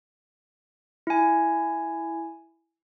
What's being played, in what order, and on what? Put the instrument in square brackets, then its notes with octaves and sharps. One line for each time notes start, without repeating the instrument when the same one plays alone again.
[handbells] E4 G#5